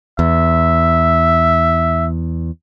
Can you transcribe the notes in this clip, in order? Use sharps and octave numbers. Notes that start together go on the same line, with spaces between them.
E2 E5